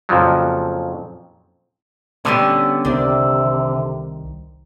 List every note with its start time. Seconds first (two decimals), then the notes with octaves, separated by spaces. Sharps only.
0.09 F2 A#2 C#3 F3 F#3
2.25 D3 G3 B3 C#4
2.85 C2 C3 D#3 D5